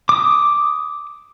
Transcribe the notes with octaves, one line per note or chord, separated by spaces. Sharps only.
D6 D#6